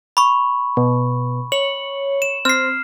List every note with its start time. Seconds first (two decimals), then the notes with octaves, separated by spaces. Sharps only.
0.17 B5 C#6
0.77 B2
1.52 C#5 F#7
2.22 E7
2.45 C4 F6 C7